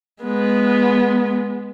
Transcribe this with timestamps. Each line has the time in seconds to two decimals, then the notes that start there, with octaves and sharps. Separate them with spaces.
0.23 G#3 B3